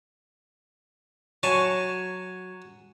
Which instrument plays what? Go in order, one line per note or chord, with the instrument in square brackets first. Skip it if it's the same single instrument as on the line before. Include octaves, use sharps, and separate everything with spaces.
[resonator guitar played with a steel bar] F#3 [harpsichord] C#5 G#5 A5